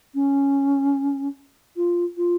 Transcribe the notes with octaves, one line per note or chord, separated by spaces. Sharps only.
C#4
F4
F4